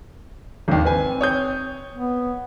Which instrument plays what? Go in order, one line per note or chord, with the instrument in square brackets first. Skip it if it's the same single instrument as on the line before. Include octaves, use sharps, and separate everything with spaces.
[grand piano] G#1 D#2
[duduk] C4 [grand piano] B4 G#5
[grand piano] C#5 D#6 G6
[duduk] B3